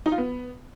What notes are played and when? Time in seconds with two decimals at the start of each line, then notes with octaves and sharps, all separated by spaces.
0.06 D#4
0.12 F4
0.18 B3